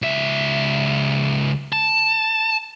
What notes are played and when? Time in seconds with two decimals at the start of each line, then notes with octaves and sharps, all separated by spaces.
0.02 C#2 E5
1.73 A5